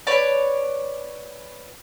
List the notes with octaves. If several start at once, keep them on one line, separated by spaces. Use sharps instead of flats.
B4 C#5 D5 A5